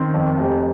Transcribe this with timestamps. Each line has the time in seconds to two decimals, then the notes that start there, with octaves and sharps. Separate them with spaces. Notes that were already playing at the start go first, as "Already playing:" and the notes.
Already playing: D#3 C4
0.14 F2
0.38 F1